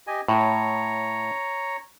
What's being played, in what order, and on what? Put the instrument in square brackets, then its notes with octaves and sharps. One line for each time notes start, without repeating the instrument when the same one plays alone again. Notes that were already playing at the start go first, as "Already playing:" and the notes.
[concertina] G4 D#5 G#5
[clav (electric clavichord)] A2 [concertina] C#5 A#5